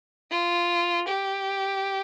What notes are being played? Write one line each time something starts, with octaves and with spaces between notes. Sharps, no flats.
F4
G4